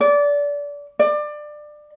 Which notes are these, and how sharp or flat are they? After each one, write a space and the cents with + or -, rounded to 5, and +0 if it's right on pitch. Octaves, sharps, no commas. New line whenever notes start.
D5 -25
D5 +25